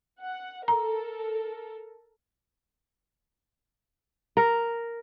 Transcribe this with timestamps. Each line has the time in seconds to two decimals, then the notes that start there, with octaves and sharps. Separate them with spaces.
0.20 F#5
0.68 A4 A#4 A#5
4.37 A#4